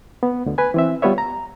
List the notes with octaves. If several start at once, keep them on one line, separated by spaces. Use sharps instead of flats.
B3
D2 D3
B4 G#5
E3 C4 E5
G3 B3 F4 B4 C#5 E5
A#5